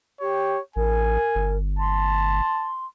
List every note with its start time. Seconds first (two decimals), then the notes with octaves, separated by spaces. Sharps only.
0.21 G4 C#5
0.76 A1 A#4 G#5
1.35 G1
1.79 A5 C6